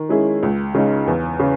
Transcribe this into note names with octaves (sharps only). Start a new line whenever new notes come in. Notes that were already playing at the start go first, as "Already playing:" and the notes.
Already playing: D#3
G#3 C#4 E4 G#4
C#2
C#3 G#3 D#4
E2
C#3